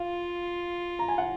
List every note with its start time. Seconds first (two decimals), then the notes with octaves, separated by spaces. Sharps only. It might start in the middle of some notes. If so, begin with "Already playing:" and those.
Already playing: F4 F5
0.99 A#5
1.08 G#5
1.18 F#5